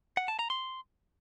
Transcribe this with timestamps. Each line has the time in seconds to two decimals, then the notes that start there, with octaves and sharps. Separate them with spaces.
0.17 F#5
0.28 A5
0.39 A#5
0.50 C6